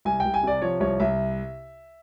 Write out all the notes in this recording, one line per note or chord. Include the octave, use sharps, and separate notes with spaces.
C2 G#5
C2 G5
G#5
C3 D5
F3 C#5
C2 C#5
C2 E5